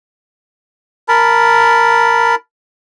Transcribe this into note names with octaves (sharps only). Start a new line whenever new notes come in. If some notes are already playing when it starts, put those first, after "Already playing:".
A#4 A5 B5